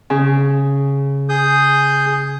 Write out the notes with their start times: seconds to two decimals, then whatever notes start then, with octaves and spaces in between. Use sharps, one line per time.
0.10 C#3
1.29 G#4 D#6 G6